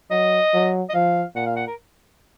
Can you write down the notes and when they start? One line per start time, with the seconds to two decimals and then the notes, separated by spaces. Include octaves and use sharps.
0.11 F#3 D#5
0.53 F#3
0.89 D#5
0.94 F3 F5
1.35 A#2 F#5
1.46 F5
1.56 F#5
1.67 A#4